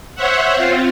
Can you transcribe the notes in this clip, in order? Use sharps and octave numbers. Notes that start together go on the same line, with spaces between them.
C5 C#5 E5 F#5
C4 F4